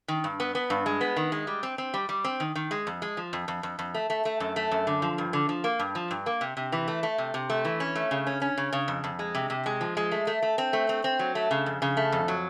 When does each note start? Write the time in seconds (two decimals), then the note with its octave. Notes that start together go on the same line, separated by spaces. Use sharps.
0.08 D#3
0.24 G2
0.40 B3
0.55 B3
0.70 G2
0.86 G#3
1.01 B3
1.16 D#3
1.32 G#3
1.47 G3
1.63 C4
1.78 C4
1.94 G3
2.09 G3
2.24 C4
2.40 D#3
2.55 D#3
2.71 G#3
2.87 F2
3.02 G#3
3.17 F3
3.33 F2
3.48 F2
3.63 F2
3.79 F2
3.94 A3
4.10 A3
4.25 A3
4.40 F#2
4.56 A3
4.71 F#2
4.87 D3
5.02 F3
5.18 G2
5.33 D3
5.49 F3
5.64 A#3
5.79 G2
5.95 F3
6.11 G2
6.26 A#3
6.41 C3
6.57 C3
6.72 E3
6.88 A3
7.03 A3
7.18 C3
7.34 C3
7.50 A3
7.65 E3
7.80 C#4
7.95 A3
8.11 C#3
8.27 C#4
8.42 C#4
8.58 C#3
8.73 C#3
8.88 F2
9.04 F2
9.19 G#3
9.35 C3
9.50 C3
9.66 G#3
9.81 F3
9.97 G#3
10.12 A3
10.27 A3
10.42 A3
10.58 C4
10.73 A3
10.89 C4
11.04 C4
11.19 F#3
11.35 A3
11.51 C#3
11.66 F2
11.82 C#3
11.97 A3
12.12 F2
12.28 F#3